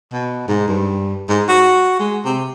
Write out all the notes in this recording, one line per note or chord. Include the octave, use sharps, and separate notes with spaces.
B2
G#2
G2
G#2
F#4
G#3
C3